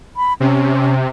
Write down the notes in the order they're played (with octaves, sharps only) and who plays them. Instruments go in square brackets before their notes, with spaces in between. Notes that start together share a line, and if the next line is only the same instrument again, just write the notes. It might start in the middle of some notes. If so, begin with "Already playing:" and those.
[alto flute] B5
[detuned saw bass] C3 [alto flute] C#4